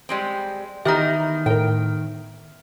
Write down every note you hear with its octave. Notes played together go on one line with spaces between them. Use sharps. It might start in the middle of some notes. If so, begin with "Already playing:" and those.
G3 G#3 C4
D#3 E3 B3 D#4 G4 E5 A#5
A2 A#4 G5